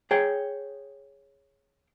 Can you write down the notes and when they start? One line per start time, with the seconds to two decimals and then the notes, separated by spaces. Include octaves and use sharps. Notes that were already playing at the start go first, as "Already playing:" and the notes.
0.11 G#4 C#5 G5